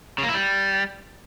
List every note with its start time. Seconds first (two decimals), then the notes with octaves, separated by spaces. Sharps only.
0.18 C#3
0.23 A#3
0.29 E4
0.34 G3